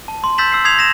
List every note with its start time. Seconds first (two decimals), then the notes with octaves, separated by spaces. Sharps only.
0.08 A5
0.24 C6
0.38 E6 G6 A6 B6 E7 F#7
0.52 E6 C7
0.65 D#6 G#6 C7 F7
0.79 A#6 E7